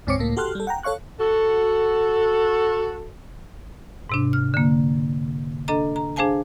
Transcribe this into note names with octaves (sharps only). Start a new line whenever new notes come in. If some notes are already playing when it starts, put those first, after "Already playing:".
D2 G#2 C4 C#5 D6 C#7
C#2 A2 A#3
F#4 G4 A4 C6 F6 F#6
G3 A4
F#5 G5 A#5
A4 C#5 F5 C#6 F#6
F#4 A4
G#2 C3 D4
F6
D3 A#3
D4 A4 D#5 A#5
A#5
D4 G#4 C5 F5 G#5 A5